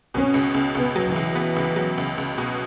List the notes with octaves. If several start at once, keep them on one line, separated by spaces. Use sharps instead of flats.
B2 C#4
C#2
C#2
C#2 B3
F#3
E3
C#2
B3
C#2
F#3
C#2
C#2
B2